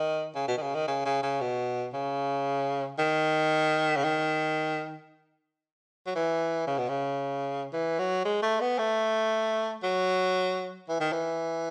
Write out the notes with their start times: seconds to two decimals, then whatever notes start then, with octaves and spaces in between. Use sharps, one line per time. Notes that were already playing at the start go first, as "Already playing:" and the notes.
Already playing: D#3
0.35 C#3
0.48 B2
0.57 D#3
0.62 C#3
0.75 D#3
0.88 C#3
1.06 C#3
1.23 C#3
1.41 B2
1.94 C#3
2.99 D#3
3.96 C#3
4.04 D#3
6.07 F#3
6.15 E3
6.67 C#3
6.78 B2
6.89 C#3
7.73 E3
7.99 F#3
8.25 G#3
8.43 A3
8.61 B3
8.79 A3
9.83 F#3
10.89 E3
11.00 D#3
11.13 E3